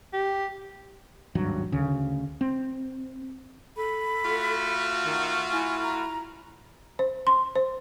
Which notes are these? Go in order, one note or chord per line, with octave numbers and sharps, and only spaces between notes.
G4
D#1 G#1 G2 F#3
D2 C#3
C4
A4 B5
A3 F4 F#4
D#3
E4 G#5
A#5
C5
C6
C5